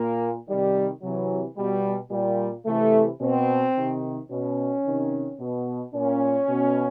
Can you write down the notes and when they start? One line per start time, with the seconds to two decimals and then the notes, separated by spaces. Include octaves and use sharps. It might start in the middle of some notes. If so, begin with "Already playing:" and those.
Already playing: A#2 A#3
0.47 C3 D#3 G3
1.02 C3 E3 F#3
1.56 B2 G3
2.11 A#2 G3
2.65 C3 E3 A3
3.20 B2 C4
3.75 C3 D#3
4.30 B2 C#4
4.84 C3 D#3
5.39 B2
5.93 A#2 C#4
6.48 B2